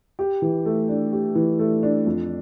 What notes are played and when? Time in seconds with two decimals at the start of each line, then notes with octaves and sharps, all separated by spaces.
0.19 G4
0.42 E3
0.66 A3
0.89 D4
1.12 G4
1.35 E3
1.59 A3
1.83 D4
2.07 F2